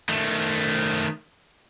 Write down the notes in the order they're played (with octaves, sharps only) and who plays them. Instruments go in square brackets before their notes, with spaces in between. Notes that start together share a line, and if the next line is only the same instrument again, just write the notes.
[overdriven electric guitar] D#3 A3